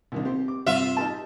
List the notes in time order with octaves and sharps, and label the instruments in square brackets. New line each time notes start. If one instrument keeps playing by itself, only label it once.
[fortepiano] C2 D#3 D4
C4 G4
D6
[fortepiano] G2 C3 [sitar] F4 E5
[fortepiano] D#4 G4 A5